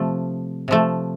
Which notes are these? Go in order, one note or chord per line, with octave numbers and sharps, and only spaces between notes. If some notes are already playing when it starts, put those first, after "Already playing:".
Already playing: C3 F3 A3
C3 F3 A3